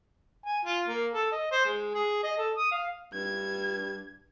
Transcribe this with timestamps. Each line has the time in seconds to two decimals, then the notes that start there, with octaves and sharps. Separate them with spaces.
0.46 G#5
0.66 F4
0.88 A#3
1.14 A4
1.32 D#5
1.51 C5
1.65 G#3
1.94 G#4
2.23 D#5
2.38 A4
2.57 D#6
2.72 F5
3.14 G2 G#6